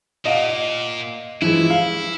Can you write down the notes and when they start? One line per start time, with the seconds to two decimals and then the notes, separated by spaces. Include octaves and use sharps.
0.25 A#2 D#5 F5 F#5
1.42 E3 F3 G#3 E4
1.70 F5